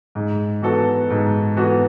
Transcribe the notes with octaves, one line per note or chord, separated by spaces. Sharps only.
G#2
E3 B3 F#4 A4
G#2
E3 B3 F#4 A4